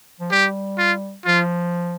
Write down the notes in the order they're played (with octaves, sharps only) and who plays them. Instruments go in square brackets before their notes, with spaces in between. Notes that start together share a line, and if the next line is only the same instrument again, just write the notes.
[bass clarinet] F3
[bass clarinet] G3 [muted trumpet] G4
[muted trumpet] F4
[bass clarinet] F3 [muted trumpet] F4